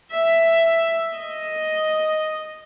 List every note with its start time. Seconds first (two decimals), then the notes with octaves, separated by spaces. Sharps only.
0.13 E5
1.16 D#5